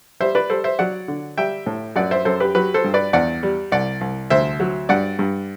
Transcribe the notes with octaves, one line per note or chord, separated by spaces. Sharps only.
G3 C5 E5
B4 D5
G3 A4 C5
C5 E5
F#3 D5 F#5
D3
G3 E5 G5
A2
F#2 D5 F#5
C5 E5
F#2 A4 C5
G4 B4
F#3 G4 B4
A4 C5
G2
B4 D5
E2 D5 F#5
G3
C2 D5 F#5
C2
D2 C5 E5
F#3
G2 D5 F#5
G2